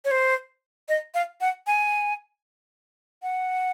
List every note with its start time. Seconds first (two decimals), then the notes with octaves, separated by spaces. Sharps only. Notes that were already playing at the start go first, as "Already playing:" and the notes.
0.05 C#5
0.11 C5
0.89 D#5
1.14 F5
1.41 F#5
1.67 G#5
3.23 F#5